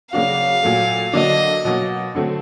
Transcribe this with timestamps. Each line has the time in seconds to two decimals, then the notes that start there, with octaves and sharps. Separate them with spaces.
0.13 C#3 F#3 A#3 D4 F#4 F5
0.63 A#2 F#3 A3
1.13 D3 F#3 A#3 D4 D#5
1.65 B2 F#3 A#3
2.15 D3 F#3 A3 C4